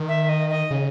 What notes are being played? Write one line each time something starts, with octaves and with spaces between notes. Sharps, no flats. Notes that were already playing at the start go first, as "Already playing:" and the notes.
Already playing: D#3
E5
D#5
D#5
C#3